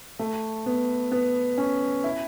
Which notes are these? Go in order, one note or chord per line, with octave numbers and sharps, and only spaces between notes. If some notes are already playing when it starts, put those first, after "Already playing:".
A3
B3
B3
C#4
E4